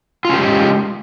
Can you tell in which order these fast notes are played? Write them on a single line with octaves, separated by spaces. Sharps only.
F4 C#4 G4 G#3